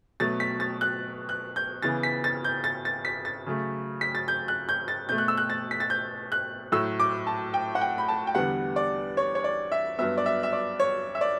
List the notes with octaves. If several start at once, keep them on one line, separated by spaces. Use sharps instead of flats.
B2 F#3 A3 A6
B6
A6
F#6
F#6
G6
C#3 E3 B3 A6
B6
A6
G6
A6
A6
B6
A6
C#3 F#3 A3
B6
A6
G6
F#6
G6
A6
B2 A3 G6
F#6
E6
F#6
A6
B6
A6
G6
F#6
A2 F#3 A3 E6
D6
A5
G5
F#5
G5
B5
A5
G5
E2 D3 G3 B3 F#5
D5
C#5
C#5
D5
E5
G2 F#3 B3 E5
D5
E5
E5
D5
C#5
E5
D5